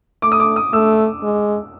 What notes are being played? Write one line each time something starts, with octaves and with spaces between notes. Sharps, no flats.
A3 D6
D#6
D6
D#6
A3 E6
G#3